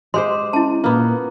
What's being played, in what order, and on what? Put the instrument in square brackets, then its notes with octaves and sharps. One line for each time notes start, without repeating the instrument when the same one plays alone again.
[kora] G#3 G4 C5 [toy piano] C6
[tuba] C#4 [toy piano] E4 A5
[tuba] A#2 [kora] A#3 B3